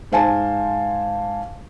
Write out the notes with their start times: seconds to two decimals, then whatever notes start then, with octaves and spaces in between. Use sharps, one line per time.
0.12 G#2 C5 F5 G#5 A5